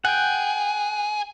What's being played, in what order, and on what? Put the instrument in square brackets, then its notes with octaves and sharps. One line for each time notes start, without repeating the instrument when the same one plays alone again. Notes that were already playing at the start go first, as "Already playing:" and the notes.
[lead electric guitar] G#4 [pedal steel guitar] F#5 G5